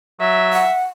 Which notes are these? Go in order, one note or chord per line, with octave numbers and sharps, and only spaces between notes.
F#3 E5
F#5